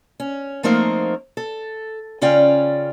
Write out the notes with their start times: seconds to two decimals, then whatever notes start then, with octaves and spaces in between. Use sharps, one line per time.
0.20 C#4
0.63 F3 A3 A#3 C4 D#4 A#4
1.37 A4
2.21 C#3 C#4 F4 D5 G5